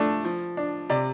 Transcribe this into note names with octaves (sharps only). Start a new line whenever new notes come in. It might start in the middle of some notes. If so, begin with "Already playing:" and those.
Already playing: F3 A3 D4
F3
D4
C3 D5